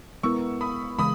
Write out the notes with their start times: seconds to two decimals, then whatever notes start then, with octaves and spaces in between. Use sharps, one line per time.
0.23 G#3 B3 E4 A#4 C#6 E6
0.61 B5 D#6
0.99 C#3 E3 G#3 B5 D#6